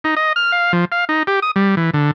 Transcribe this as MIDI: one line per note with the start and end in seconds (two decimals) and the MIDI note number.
0.04 0.15 63
0.17 0.33 75
0.36 0.52 89
0.52 0.72 77
0.73 0.85 53
0.92 1.05 77
1.09 1.23 63
1.27 1.40 67
1.42 1.51 87
1.56 1.75 55
1.77 1.90 52
1.94 2.11 50